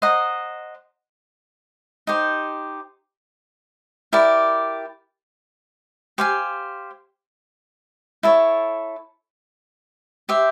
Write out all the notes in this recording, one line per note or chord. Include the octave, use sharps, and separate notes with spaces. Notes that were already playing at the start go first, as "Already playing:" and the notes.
C5 D#5 F#5 A#5
D#4 G4 C5
E4 G4 A#4 D5
G4 C5 F5 G#5
E4 A4 C#5
G4 C5 E5